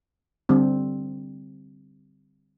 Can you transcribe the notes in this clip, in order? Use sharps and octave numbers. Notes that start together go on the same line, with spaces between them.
D3 G3 C4